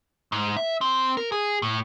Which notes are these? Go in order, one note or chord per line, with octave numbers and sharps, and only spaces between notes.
G#2
E5
C4
A#4
G#4
A2